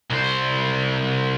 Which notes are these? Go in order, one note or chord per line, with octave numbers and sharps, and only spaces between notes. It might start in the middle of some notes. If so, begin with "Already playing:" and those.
C2 C5